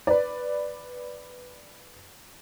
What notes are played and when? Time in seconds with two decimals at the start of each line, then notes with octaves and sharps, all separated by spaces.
0.07 B4 D5